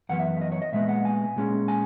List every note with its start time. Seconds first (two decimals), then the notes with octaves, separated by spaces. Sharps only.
0.09 F#2 E3 B3 F#5
0.19 E5
0.37 E5
0.41 D#5
0.52 C#5
0.62 D#5
0.72 A#2 G#3 B3 E5
0.89 F#5
1.05 G#5
1.36 A#2 G#3 C#4
1.68 G#5